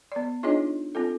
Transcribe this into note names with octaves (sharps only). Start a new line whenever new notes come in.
B3 D5
D4 D#4 F4 G#4 C#5 D#5
C4 F4 A4